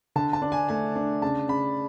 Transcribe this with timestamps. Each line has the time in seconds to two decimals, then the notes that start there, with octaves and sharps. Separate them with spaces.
0.16 D3 A5
0.33 A5
0.42 D4
0.52 G#5
0.69 A3 G#5
0.96 D4
1.22 C#3 A5
1.48 C#3 B5